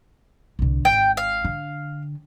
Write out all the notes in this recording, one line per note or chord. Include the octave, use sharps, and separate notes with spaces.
C2 D3
G#1 G5
F5
D3